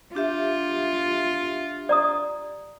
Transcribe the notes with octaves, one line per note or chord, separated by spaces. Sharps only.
D4 F4 G4 E5
D5 A#5 D#6